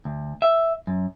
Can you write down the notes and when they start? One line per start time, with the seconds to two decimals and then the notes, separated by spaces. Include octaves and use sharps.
0.05 D2
0.42 E5
0.87 F#2